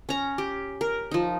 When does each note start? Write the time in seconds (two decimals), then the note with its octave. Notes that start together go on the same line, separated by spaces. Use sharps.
0.09 C#4 A#5
0.38 G4
0.81 A#4
1.11 F3 D#4